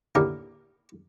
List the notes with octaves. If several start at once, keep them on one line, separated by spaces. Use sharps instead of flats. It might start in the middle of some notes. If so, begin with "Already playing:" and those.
D#2 A2 D3 G4 A#4